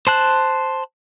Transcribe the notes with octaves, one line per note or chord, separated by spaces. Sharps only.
C5 A5 F#6